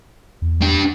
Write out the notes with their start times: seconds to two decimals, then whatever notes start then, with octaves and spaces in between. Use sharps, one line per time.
0.42 E2
0.62 D4 G4